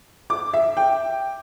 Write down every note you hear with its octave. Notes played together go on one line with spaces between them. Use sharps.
D6
E5
G5